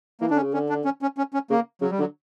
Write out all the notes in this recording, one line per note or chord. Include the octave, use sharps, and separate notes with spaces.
E3 A#3
D3 D4
C#4
C#3
D3 C#4
D4
C#4
C#4
C#4
C#4
C#3 A#3
C#3 F#3
G3
D3 F#3